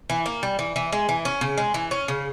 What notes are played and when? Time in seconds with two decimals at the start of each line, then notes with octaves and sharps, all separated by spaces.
0.10 E3
0.26 A#3
0.43 G3
0.59 E3
0.76 E3
0.92 G#3
1.09 E3
1.25 C#4
1.41 C#3
1.58 G#3
1.74 E3
1.91 C#4
2.08 C#3